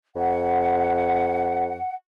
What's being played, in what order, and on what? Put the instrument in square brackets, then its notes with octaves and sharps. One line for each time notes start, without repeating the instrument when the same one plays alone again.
[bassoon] F2 [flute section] F#5